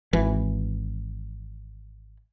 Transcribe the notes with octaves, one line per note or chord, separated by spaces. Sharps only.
G#1 E3